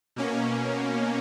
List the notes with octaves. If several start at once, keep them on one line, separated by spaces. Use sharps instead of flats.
B2 A#3 C#4